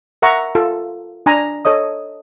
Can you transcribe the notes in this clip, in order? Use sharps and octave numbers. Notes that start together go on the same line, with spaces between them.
A#4 E5 F#5 A#5 C#6
F4 A4
D4 G#5 A#5
A4 C#5 D#5 D#6